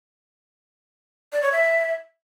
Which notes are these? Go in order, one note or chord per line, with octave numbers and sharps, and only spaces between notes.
D5
C#5
E5